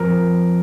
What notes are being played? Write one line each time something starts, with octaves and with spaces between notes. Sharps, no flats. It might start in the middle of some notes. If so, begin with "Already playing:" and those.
Already playing: F2 A#4